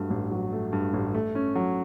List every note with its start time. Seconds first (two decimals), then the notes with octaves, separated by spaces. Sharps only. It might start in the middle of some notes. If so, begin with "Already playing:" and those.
Already playing: G2 F#3 A3
0.10 A1
0.31 F#3
0.53 A3
0.73 G2
0.94 A1
1.14 A3
1.35 C#4
1.55 F#3